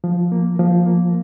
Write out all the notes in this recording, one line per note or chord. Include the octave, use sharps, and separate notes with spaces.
F3
A#3
F3
A#3